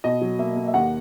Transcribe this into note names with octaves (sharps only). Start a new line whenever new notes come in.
B2 D#5
F#3
A#3 E5
A#3
E5
D#2 F#5